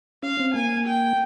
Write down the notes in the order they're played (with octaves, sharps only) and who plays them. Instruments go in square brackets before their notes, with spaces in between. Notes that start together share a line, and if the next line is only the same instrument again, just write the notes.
[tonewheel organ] C#4 [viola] F5
[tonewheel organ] C4
[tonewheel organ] A#3 [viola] G#5
[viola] G5